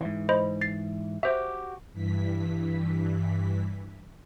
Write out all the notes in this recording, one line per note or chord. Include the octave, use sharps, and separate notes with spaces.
G#2 E3
C5 D#5 B5
A6 C7
F#4 G4 C5 E5
G2 E3 B6